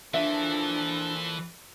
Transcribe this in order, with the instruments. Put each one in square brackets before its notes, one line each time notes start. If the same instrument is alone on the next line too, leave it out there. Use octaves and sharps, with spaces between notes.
[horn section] A#2 F3 A4 [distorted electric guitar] E3 [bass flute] D4 [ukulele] E5